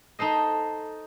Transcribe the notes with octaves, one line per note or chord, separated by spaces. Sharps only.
D#4 A4 C5 D#5